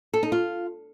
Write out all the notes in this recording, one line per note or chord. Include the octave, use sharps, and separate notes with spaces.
A4
D#4
F4